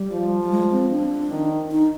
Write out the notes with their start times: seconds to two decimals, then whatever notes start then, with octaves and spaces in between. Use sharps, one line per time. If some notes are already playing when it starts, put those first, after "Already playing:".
Already playing: G3
0.12 F3
0.41 G3
0.51 G#3
0.72 C4
0.91 D4
1.31 D#3
1.72 D#4